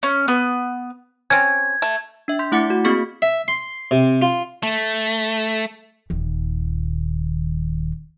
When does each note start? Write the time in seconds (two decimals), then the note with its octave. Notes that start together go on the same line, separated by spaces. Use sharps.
0.03 C#4
0.28 B3
1.30 C4 C#4 G#6
1.82 A3
2.28 D4 E5
2.39 C6 G6 B6
2.52 A3 E4 F#5 D6 A6 C#7
2.70 F#4
2.84 A#3 C4 F#4 G#4 C#6 B6
3.22 E5
3.48 C6
3.91 C3
4.22 F4
4.63 A3
6.10 D#1 D#3